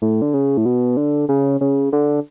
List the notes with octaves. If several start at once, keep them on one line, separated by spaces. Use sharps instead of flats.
A2
D3
C#3
A2
B2
D3
C#3
C#3
D3